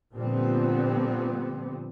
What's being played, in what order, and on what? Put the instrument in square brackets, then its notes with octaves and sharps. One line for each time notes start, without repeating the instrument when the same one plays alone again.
[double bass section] A#2 D3 F3 G3 B3 C4